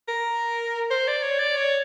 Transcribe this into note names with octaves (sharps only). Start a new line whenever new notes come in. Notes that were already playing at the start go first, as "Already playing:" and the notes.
A#4
C5
D5
C#5
D5
C#5